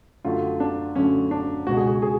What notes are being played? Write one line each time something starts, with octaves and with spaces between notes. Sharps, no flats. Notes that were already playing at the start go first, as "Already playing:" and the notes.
F#2 D3 F#3 A3 F4
D4
F#2 D3 F#3 A3 C#4
D4
C#2 B2 G#3 F#4
G#4
F#4
G#4